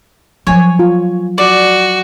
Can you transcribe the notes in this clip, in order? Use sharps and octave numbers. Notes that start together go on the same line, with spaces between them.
F3 F#3 C#5 G#5
F4
F#4 D5